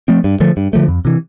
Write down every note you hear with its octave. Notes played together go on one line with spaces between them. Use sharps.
F3 A3 C4
G2
D3 F3 A3
G2
D3 F3 A3
F2
C3 E3